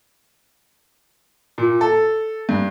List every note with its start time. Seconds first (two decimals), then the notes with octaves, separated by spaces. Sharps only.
1.58 A#2
1.81 A4
2.49 G2